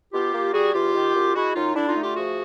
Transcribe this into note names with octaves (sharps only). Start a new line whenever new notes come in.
B2 F4 G4
A#3
G3 F#4 G#4
E2 F4 G4
D#3
F#2
G#3 E4 F#4
F#2 D#4 F4
D3 D4 E4
D#4 F4
A3
F4 G4
F3 F#4 G#4